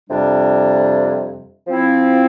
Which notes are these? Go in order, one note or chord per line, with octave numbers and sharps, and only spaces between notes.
F2 C3 G3 D4
F3 C4 E4